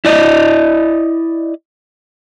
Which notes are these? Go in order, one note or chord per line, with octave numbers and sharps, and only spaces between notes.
E4 D5 D#5